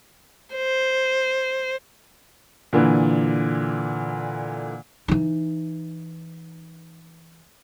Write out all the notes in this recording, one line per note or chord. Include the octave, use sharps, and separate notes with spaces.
C5
A#2 D3 E3
E3 D#4